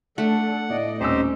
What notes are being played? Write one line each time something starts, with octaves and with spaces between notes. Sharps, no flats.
A3 D4 A4 F#5
A2 D5 D#5
D#1 C4 C#4 D#4 G4 C5 E6